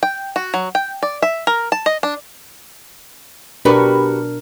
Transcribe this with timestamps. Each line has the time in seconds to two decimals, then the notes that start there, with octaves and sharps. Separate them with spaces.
0.03 G5
0.36 F#4
0.54 F#3
0.75 G5
1.03 D5
1.22 E5
1.47 A#4
1.72 A5
1.86 D#5
2.03 D4
3.65 B2 D4 F#4 G4 A#4 B4